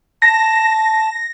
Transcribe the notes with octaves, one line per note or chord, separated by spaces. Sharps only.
A5 A#6